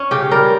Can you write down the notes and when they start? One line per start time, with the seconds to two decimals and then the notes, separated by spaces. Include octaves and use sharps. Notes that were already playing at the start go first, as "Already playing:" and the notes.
Already playing: C#4
0.11 C#3 G4
0.31 G3 A#4